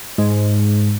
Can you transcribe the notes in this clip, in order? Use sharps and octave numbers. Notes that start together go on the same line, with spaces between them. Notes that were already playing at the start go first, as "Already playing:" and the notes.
G#2